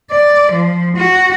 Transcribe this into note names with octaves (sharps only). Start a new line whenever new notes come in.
D5
F3
F#4